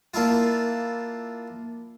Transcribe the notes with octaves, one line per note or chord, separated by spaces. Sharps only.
A#3 D4 E4 F4